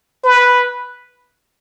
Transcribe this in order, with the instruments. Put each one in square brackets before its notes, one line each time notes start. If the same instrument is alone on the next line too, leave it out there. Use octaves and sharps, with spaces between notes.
[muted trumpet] B4